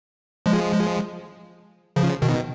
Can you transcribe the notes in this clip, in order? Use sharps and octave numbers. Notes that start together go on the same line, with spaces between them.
F3 G#3
C#3 F3
B2 D#3